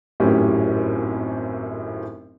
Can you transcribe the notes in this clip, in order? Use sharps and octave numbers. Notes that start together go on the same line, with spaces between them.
G#1 F#2 A2 C#4 G4